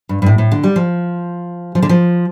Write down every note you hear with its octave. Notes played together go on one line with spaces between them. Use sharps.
G2
G2
A2
A2
D3
G3
F3
F3
D3
F3